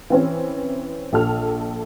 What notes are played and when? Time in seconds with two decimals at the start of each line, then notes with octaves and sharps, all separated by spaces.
0.10 E3 C4 C#4
1.13 A#1 A4 F6